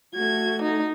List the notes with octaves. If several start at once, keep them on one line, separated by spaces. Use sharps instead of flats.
A3 F#4 G#6
D#4